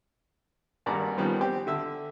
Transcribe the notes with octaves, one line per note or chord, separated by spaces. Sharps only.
G#1 G2 A#3 D5 F#5 A#5
D#3 F3 G3 B3 C4
C4 G4
D3 E5 E6